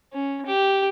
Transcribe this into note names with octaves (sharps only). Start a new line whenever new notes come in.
C#4
G4